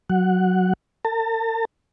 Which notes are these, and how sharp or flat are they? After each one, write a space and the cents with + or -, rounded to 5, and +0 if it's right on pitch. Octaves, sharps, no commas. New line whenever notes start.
F#3 +0 F#5 +0
A#4 -45 A5 +40